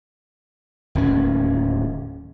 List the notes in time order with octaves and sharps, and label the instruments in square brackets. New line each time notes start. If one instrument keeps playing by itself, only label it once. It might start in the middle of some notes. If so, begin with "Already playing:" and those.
[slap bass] D1 D#2 C#4